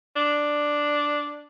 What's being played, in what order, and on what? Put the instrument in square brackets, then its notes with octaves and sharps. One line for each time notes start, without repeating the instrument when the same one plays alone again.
[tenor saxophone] D4